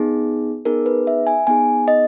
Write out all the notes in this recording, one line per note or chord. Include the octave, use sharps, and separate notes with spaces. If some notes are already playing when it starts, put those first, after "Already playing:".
Already playing: B3 D#4 G#4
B3 D#4 G#4 A#4
B4
E5
G#5
B3 D#4 G#4 G#5
D#5